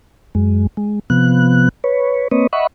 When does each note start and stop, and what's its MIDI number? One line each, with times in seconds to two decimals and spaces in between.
0.35 0.67 42
0.35 0.67 56
0.77 0.99 56
1.10 1.69 48
1.10 1.69 53
1.10 1.69 59
1.10 1.69 90
1.84 2.28 71
1.84 2.28 73
2.31 2.47 58
2.31 2.47 60
2.31 2.47 71
2.31 2.47 73
2.31 2.47 75
2.53 2.67 75
2.53 2.67 76
2.53 2.67 78
2.53 2.67 83
2.53 2.67 85